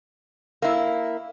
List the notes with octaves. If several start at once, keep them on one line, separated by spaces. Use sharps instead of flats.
A#3 E4